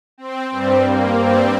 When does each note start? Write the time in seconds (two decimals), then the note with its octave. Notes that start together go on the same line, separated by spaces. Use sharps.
0.18 C4
0.49 G2 G3 C4
0.83 A#3
1.15 G2 G3 C4